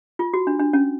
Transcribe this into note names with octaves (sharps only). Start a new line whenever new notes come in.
F4
F#4
D4
D4
C#4